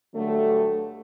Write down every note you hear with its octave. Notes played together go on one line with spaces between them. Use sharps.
G2 D3 F#3 A3